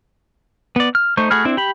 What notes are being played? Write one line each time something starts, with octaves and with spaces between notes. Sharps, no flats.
B3 D5
F6
A3 D#4 C5 C#6
A3 F#4 G#4 B5 F6
C4 D4 E4
G4 B5